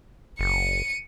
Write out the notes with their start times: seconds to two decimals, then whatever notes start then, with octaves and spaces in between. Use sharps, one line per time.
0.39 F#1 C#7 D#7